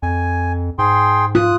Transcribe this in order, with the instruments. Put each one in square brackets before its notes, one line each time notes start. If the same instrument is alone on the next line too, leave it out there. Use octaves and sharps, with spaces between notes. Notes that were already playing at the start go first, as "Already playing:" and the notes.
[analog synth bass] F2 [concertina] G#5
[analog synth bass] G#2 [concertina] G#4 G5 C6
[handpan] F4 [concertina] D#6 F#6